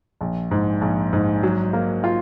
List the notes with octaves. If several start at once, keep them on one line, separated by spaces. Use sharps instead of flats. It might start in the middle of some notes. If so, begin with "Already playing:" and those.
A#1
G#2
A#1
G#2
F#3
A#3
F4